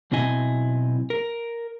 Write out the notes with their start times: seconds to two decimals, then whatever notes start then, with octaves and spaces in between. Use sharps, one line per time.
0.11 B1 B2 C4 E4 D#5 G#5
1.10 A#4